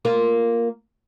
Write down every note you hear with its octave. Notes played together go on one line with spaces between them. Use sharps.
A#3 F4 A#4